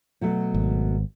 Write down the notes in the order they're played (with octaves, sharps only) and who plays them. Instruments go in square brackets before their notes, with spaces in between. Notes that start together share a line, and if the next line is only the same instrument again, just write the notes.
[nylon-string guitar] B2 F#3 A3
[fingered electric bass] G#1